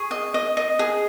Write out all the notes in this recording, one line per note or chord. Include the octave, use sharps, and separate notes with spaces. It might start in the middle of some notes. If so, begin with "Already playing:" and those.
Already playing: G#4 C#6
D#5
D#5
D#5
G#4